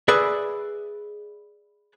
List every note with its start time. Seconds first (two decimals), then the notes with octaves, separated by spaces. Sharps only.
0.08 G#4 B4 D5 E5